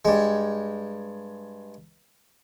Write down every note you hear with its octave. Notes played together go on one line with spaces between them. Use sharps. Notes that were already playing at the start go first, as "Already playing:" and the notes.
G2 G#3